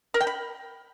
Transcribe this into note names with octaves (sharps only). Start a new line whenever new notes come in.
A#4
G5
B5